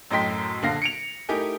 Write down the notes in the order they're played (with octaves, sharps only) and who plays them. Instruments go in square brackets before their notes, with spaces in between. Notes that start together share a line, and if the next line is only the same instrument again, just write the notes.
[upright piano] F#2 A2 D#5 G5 C6 B6
A#1 D3 F5 A#6
C#7 D7 F7
A3 D#4 E4 G4 A#4 G#5